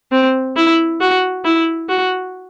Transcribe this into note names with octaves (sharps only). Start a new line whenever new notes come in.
C4
E4
F#4
E4
F#4